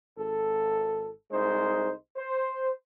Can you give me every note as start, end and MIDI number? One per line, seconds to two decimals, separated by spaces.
0.18 1.10 32
0.18 1.10 69
1.31 1.91 36
1.31 1.91 56
1.31 1.91 63
1.31 1.91 72
2.17 2.70 72